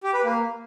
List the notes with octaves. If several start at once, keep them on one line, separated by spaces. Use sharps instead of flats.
G4
B4
A#3